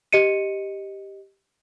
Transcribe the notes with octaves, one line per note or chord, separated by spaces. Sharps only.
G4 D#5 C#7 D#7